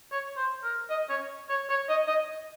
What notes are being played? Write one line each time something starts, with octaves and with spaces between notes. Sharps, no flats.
C#5
C5
A#4
D#5
C#5
C#5
C#5
D#5
D#5